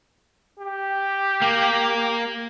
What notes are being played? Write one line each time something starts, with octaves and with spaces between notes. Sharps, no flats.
G4
A#3